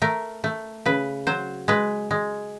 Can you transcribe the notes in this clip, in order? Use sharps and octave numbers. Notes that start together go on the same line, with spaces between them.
A3 A#4
A3
C#3 B4
F#3 C5
G#3 B4
G#3